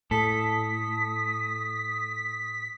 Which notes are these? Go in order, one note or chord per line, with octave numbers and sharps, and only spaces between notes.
A2 A4 D#6 B6